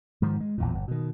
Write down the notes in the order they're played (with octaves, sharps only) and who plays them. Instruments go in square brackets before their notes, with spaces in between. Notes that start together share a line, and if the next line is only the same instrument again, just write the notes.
[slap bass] G#2 D#3 F3
G#3
A#1 E2 A#2
G1
B2 D#3